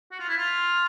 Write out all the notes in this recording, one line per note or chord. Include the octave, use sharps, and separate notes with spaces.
F#4
F4
E4
F4